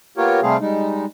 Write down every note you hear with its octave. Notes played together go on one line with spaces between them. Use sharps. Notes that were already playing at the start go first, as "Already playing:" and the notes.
A#3 B3 F4 G4 A#4 C#5
C3 G3 A3 C4 G#4 F5
G3 G#3 D#4